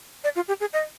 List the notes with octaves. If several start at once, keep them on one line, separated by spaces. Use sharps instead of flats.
D5
F4
G4
G#4
D#5